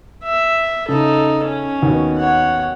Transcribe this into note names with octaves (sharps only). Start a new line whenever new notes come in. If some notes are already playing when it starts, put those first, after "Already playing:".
E5
C#3 D#4 A4
C#4
D#2 B2
C#5 F#5